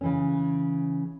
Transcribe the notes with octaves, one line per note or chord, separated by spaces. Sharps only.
C#3 E3 C#4